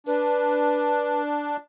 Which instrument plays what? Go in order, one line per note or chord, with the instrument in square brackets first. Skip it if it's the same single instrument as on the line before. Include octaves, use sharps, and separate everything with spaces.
[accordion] D4 [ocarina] B4